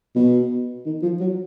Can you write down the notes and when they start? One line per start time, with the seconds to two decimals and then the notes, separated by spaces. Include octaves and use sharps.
0.16 B2
0.86 D#3
1.03 F3
1.20 F#3